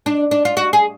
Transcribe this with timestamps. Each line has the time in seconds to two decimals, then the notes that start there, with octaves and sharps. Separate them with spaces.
0.06 D4
0.31 D4
0.45 F4
0.57 F#4
0.73 G#4